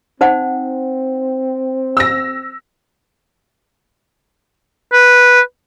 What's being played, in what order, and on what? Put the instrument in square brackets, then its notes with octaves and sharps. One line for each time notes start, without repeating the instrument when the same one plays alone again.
[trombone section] C4 [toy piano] D#4 C5 F#5
[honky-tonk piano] E6 A#6
[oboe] B4